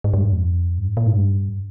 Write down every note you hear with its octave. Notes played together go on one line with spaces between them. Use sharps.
G#2
G2
G#2
F2
G2
G#2
A#2
G#2
G2